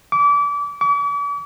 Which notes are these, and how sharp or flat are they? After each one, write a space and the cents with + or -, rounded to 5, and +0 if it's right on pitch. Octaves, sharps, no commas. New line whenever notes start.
D6 -30
D6 -45